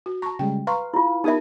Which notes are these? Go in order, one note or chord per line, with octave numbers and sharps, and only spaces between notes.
F#4
A5 A#5 C#6
C#3 G3 G#3 G5
B4 F5 A#5 C6 C#6
E4 F4
B3 D#4 G4 A#4 E5 B5 D#6